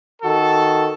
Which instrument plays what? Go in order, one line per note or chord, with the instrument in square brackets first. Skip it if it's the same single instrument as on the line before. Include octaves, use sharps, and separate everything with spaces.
[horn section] D#3 F#4 A4